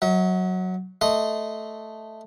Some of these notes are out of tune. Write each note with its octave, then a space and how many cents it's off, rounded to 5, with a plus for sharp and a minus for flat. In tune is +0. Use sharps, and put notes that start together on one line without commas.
F#3 +0 E5 -45
A3 +0 D#5 +0 C6 -20